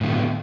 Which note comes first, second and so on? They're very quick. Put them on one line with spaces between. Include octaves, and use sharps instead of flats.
A2 D3 B3